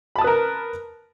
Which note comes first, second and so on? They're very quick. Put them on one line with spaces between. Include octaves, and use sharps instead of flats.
B5 A5 D#6 B4 A#4